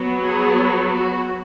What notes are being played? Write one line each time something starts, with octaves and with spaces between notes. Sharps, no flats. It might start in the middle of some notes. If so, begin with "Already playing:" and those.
Already playing: F#3 B3
G#4
F#4